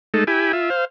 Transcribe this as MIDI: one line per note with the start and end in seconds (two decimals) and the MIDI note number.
0.14 0.24 56
0.14 0.24 57
0.14 0.24 63
0.14 0.24 69
0.27 0.52 64
0.27 0.52 67
0.27 0.52 80
0.27 0.52 83
0.53 0.70 65
0.53 0.70 76
0.70 0.85 72
0.70 0.85 77